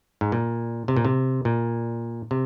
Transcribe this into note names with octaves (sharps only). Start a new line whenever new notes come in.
G#2
A#2
C3
A#2
C3
A#2
C3